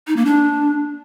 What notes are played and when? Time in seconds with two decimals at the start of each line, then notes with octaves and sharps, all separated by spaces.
0.08 D#4
0.17 A#3
0.26 D4